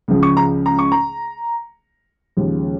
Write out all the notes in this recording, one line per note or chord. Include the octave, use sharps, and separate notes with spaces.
C#2 C#3 F3
C#6
A#5
A#5
C#6
A#5
D#2 C#3 F3 G#3